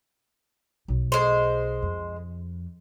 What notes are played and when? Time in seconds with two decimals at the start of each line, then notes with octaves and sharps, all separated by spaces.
0.88 B1
1.12 G#3 C5
1.82 F2